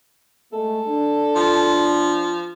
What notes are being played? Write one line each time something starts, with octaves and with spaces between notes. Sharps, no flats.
G#3 A3 A4
D4
F3